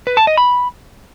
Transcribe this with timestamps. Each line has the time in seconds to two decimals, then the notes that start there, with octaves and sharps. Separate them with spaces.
0.07 B4
0.17 A5
0.27 D#5
0.37 B5